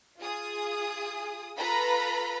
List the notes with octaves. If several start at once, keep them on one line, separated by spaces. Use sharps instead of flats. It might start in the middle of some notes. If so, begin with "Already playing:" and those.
F4 G#4 D#6
F4 A4 B4 A#5 B5